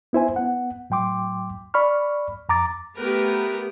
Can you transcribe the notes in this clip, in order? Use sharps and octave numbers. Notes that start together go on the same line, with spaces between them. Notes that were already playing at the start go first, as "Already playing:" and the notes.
B3 E4 C5 G#5
B3 F#5
A2 F#3 G5 C6 D6
D5 B5 C#6 F6
F2 A#5 D6 A6
A3 B3 G4 A#4 B4